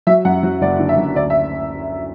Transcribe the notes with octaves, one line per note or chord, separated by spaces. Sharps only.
F#3 E5
F#2 F#5
F#3
F#1 D5
D3
E5
F#2
D2 D5
E5